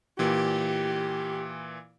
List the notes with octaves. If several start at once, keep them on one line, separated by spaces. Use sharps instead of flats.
A#2 E3 G4